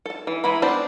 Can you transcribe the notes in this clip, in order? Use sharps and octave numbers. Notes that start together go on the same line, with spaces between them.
A4 A5
E3
E3 G#3 E4 A#5 B5
B3 C4 D4 C5 A5